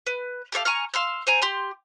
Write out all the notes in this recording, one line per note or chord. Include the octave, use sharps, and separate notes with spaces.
B4
G4 A4 C#5 F5
G#5 A#5 C#6 F6
F5 C6 E6
C5 G#5 A#5
G4 C6